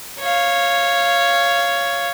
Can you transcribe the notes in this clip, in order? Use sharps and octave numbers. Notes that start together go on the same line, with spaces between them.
C#5 F5